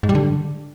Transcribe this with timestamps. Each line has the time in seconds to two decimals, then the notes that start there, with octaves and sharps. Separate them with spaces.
0.03 G#2
0.09 G3
0.15 D3